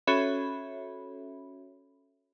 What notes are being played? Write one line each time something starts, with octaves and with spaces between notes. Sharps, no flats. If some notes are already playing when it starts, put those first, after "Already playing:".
C#4 F#4 A4 C#5 E5 B5